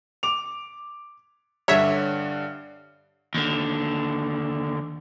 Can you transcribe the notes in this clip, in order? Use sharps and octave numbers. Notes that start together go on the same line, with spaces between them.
D6 F7
G2 D3 C#5 E5
D#2 D3